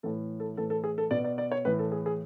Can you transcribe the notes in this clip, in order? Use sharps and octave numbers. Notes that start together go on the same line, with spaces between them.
A2 E3 A4
A4
A2 E3 A4
A4
G#4
A4
B2 D5
D5
D5
C#5
A2 E3 B4
A4
G#4
G#4